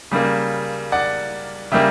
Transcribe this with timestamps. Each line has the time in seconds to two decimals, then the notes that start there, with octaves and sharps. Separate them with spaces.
0.11 C#3 G3 A#3
0.92 D5 F#5
1.72 C#3 G3 A#3 E5 G5